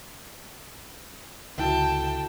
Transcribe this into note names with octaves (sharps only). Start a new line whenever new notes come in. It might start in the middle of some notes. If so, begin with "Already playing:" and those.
C#2 D3 E4 F#4 G5 A5